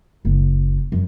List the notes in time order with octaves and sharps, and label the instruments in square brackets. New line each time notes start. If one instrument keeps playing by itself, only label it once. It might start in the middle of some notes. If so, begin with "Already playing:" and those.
[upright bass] F#1
F#2